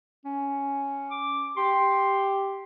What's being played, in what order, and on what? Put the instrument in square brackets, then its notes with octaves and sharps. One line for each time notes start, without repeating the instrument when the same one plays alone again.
[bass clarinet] C#4
[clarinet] D6
[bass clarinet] G4 [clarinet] C6